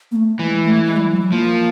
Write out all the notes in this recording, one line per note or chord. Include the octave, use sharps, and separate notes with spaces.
A#3
A3
E3 G#3
A3
G#3
G3
F#3
F#3
F3 A#3